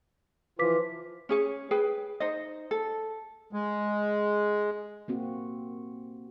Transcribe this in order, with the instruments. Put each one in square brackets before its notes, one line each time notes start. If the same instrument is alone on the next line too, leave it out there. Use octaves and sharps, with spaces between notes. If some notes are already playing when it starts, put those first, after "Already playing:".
[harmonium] E3 F3 F4 [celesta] B4 D6 B6
[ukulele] C#4 G#4 C#5
G#4 B4 G5
D#4 C5 D#5
A4
[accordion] G#3
[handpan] A#3 C4 F#4